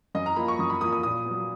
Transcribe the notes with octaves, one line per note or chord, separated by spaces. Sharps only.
F#2 D#5
A#5
F3 A#3 B5
C#6
F#2 D#6
B5
F3 A#3 D#6
D#6
A#2 D#6
F#3 B3